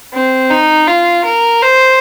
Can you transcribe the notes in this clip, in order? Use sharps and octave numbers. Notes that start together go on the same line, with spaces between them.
C4
D#4
F4
A#4
C5